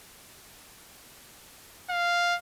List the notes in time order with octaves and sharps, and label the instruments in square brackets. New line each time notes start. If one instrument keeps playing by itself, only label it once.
[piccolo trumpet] F5